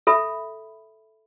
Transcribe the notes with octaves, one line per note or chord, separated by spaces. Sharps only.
A4 E5 B5